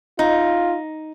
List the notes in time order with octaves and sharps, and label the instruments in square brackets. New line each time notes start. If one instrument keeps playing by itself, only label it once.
[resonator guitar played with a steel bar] D#4 [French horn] F4